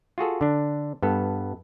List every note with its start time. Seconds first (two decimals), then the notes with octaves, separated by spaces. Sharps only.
0.18 F4 F#4 G#4 A4
0.41 D3 D4
1.03 G2 B3 A4